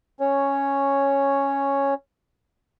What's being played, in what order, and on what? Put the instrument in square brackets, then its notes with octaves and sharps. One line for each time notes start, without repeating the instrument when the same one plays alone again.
[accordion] C#4 C#5